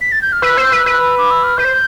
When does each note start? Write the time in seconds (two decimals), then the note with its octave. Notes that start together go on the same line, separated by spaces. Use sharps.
0.01 B6
0.12 A6
0.22 G6
0.32 F6
0.42 B4 E6
0.57 C5
0.72 B4
0.86 B4
1.18 D6
1.31 E6
1.44 F6
1.57 B4 G6
1.65 C5